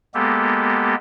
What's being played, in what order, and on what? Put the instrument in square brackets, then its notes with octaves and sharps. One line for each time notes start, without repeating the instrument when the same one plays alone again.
[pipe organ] G#3 A#3 B3 G4 A4